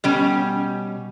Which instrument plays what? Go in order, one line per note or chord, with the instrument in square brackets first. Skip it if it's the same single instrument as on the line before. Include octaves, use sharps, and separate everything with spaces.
[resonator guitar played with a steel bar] B2 G3 C#4